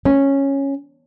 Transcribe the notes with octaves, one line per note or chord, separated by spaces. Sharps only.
C#4